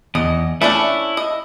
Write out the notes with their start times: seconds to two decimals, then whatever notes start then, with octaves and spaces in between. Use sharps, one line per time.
0.15 E2 D#5
0.62 A3 C#4 D4 E4
1.17 D#5